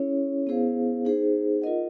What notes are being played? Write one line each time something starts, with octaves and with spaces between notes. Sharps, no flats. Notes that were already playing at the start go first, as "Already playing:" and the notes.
Already playing: C#4 E4 G#4 C#5
B3 E4 G#4 C5 F5
D#4 G#4 C5
F4 A#4 D#5 F#5